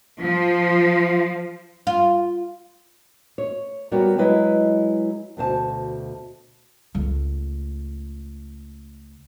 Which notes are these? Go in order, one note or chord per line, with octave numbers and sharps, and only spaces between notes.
F3
F4
C#5
G3 B3 F#4 A#4 C#5 D5
F#3 G#3 E4 B4 D#5
D2 B2 C5 A5
C#2 A3